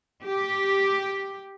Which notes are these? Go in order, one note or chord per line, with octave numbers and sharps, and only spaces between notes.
G4